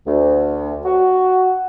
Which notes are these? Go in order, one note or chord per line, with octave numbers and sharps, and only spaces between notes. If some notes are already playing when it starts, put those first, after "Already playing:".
D2
F#4